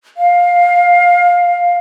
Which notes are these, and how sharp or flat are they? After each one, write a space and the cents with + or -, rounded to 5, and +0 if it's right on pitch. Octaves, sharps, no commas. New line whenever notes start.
F5 +15